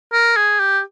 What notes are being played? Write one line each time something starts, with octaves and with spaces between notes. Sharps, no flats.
A#4
G#4
G4